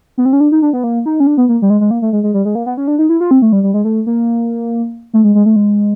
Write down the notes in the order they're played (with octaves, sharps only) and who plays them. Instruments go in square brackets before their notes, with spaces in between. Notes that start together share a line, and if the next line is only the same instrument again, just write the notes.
[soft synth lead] B3
C4
C#4
D4
D#4
D4
B3
A#3
D#4
C#4
D4
B3
A#3
G3
G#3
G#3
A#3
A3
G#3
G#3
G3
G#3
A#3
B3
C#4
D4
D#4
E4
F4
C4
A3
G3
G3
G#3
A3
A#3
A3
G#3
G#3
A3
G#3